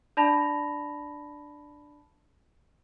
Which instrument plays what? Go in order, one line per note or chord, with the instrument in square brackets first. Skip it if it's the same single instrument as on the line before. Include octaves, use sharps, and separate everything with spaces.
[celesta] D4 D5 A5 B5 A#6 F7